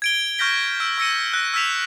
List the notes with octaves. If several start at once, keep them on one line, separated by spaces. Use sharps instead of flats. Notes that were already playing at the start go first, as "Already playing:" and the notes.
G#6 D7 G7
C#6 F6 G6 A#6 B6 G7
E6 G6 B6 D7
C#6 E6 A#6 C#7 D#7
E6 F#6 A#6
E6 F6 G#6 B6 E7 F7